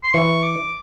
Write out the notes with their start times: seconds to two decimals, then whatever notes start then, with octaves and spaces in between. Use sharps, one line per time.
0.04 C6
0.14 E3 C#6
0.43 D6